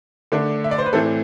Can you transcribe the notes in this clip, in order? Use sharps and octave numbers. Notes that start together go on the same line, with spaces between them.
D3 A3 D4
E5
D5
C5
B4
A2 E3 A3 C4 A4